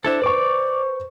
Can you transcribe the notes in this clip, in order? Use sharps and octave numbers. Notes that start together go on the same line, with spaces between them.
D4 E4 A4 C5
B4 D5 C#6 D6